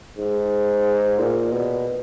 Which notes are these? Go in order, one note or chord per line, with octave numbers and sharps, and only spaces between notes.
G#2
A#2
B2